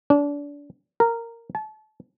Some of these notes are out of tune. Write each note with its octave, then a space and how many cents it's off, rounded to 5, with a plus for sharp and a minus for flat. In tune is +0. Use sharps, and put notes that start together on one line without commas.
D4 -30
A#4 -10
A5 -30